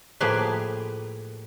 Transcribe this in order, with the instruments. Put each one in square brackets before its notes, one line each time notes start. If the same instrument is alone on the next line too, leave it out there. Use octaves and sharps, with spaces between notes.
[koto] A2 F3 A#3 G4 G#4 B4